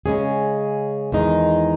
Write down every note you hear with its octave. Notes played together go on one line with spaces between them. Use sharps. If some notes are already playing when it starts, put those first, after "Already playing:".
C#3 G#3 C#4 G#4
E2 D#3 G#3 D#4